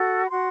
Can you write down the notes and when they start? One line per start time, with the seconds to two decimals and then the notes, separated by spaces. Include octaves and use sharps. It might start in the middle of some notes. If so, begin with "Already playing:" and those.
Already playing: F#4 A4
0.26 B5
0.31 F#4 C6